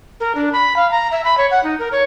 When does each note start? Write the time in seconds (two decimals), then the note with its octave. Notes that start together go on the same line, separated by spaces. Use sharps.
0.20 A#4
0.35 D4
0.53 B5
0.76 F5
0.91 A#5
1.12 E5
1.24 B5
1.38 C#5
1.51 F#5
1.63 D#4
1.79 A#4
1.92 C#5